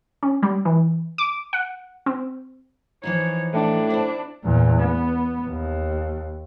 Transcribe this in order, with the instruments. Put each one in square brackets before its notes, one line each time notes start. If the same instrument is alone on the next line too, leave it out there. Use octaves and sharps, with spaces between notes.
[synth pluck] C#4
G3
E3
D6
F#5
C4
[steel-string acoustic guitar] E3 F3 D#4 [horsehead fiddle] C#5
[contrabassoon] A2 [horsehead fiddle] D4
[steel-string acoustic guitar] C4 E4
[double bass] E2 A#2
B3
D#2